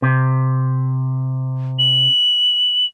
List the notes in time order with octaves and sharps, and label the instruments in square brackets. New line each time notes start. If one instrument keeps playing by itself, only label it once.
[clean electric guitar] C3
[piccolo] F#7